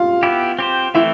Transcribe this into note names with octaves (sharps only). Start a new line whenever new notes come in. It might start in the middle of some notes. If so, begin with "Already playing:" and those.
Already playing: F4 F5
B3 E4 G4
C4 G4 C5
E3 A3 C4 E4 E5